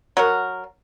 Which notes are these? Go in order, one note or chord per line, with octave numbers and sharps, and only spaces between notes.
F#3 F#4 A#4